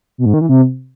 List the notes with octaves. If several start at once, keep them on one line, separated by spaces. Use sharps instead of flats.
B2
G#2
D#3
E3
C3